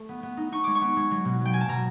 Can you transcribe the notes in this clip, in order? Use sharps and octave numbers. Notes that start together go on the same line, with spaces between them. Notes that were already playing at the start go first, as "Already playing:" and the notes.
Already playing: A3
B3
B3
D#4
D#4 C#6
G#3 D6
C#6
B3
G#3
F#3
B2
F#3
G5
A#3 G#5
A5
B2 A#5